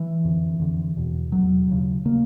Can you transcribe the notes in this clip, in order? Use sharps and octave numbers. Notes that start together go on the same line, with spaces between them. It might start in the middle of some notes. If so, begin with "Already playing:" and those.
Already playing: E3
F2 D3
F2 D3
E2 B2
E2 B2 F#3
D#2 C#3
C#3 A#3